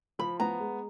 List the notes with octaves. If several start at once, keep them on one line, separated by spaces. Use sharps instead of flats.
F3 B5
B3 A#5
G#3